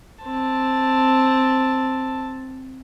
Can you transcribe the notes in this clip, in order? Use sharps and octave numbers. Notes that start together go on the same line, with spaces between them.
C4 A5